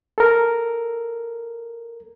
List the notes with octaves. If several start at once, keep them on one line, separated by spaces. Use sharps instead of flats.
A4 A#4